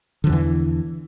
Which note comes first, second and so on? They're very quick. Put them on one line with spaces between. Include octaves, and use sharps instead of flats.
D3 F3 E2 E3